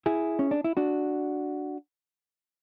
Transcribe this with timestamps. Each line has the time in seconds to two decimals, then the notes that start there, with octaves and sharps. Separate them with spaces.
0.06 E4 G#4
0.39 C#4
0.51 D4
0.64 E4
0.77 D4 F#4